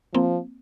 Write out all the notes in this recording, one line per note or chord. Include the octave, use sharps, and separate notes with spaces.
F3 A#3 C4